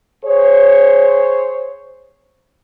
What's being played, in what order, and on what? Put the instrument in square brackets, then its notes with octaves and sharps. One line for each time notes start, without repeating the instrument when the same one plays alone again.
[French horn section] G#4 C5 C#5